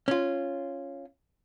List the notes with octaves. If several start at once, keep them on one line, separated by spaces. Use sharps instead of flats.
C#4 F4